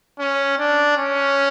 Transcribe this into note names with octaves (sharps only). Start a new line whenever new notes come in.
C#4
D4
C#4